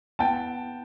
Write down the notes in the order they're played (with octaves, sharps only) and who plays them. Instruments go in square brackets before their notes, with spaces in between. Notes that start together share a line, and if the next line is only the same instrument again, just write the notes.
[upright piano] B3 G5 A5